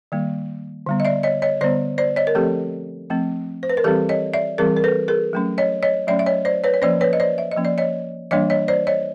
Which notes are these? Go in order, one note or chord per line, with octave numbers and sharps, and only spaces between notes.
D#3 G3 A#3
D3 G3 B3
D#5
D5 E5
C#5 D#5
C#5 D#5
D3 G3 B3 C5 D5
C5 D5
C#5 D#5
A#4
F3 A3 C4 G4 A4
F3 A3 C4
C5
B4
A#4
E3 G3 C4 G4 A4
C#5 D#5
D5 E5
E3 G3 C4 G#4 A#4
A#4
A4 B4
G#4 A#4
F#3 A3 C#4
C#5 D#5
C#5 D#5
F#3 A3 C#4 D5 E5
E5
C#5 D#5
C5 D5
B4 C#5
C#5
F3 A#3 C#4 C5 D5
B4 C#5
D#5
C5 D5
E5
D#5
F3 A#3 C#4
D5
C#5 D#5
E3 G3 A#3 D4 C#5 D#5
C#5 D#5
C5 D5
C#5 D#5